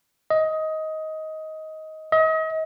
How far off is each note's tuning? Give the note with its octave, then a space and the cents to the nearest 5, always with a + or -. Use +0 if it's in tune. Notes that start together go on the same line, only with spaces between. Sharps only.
D#5 +15
D#5 +35